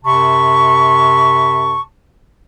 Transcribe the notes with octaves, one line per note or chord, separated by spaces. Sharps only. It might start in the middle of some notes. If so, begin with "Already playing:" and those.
F#2 C3 A5 B5 C#6